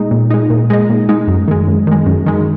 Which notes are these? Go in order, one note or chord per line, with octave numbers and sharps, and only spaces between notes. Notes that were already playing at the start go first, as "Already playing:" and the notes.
Already playing: A#2 G#3 D#4
A#2
G#3 D#4
A#2
G#3 D#4
A#2
G#3 D#4
F#2
D#3 G#3
F#2
D#3 G#3
F#2
D#3 G#3